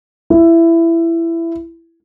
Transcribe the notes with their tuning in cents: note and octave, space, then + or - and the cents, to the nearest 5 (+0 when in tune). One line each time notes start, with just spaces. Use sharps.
E4 +15